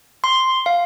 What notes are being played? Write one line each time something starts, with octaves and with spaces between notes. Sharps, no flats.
C6
F5